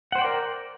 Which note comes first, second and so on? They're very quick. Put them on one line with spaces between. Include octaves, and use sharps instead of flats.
F#5 C5 G5 D5 A#4